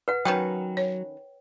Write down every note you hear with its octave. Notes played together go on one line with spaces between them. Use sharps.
B4 F#5
D#3 F#3 C#4 F#4 B4 G5
C#5